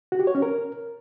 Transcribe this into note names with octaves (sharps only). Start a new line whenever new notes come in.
F#4
G4
C#5
C#4
A#4